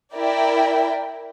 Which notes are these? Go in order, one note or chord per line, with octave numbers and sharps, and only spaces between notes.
E4 A#4 D5 G5